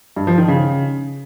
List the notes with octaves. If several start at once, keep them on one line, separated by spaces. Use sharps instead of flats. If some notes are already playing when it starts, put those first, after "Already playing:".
G2
F3
D#3
C#3